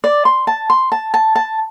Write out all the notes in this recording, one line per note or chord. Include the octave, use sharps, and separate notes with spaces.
D5
C6
A5
C6
A5
A5
A5